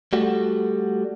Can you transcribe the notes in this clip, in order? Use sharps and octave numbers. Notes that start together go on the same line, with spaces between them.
G3 A3 F#4